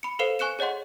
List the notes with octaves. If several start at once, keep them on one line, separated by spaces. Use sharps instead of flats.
B5 C#7
A4 B4 C5 F5 C7 E7
G#5 C#6 F#6 C#7 E7
G#4 C#5 D#5 F#5 C6